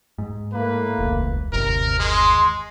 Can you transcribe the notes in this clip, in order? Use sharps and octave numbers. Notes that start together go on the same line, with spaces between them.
G#2
A2 A3 A#3 B4
E1 C#2
G1 D#2 C3 A#4
G#3 C6